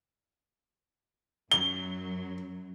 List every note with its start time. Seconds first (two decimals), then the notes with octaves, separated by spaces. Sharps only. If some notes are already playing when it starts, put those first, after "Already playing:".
1.52 F#2 F#3 G7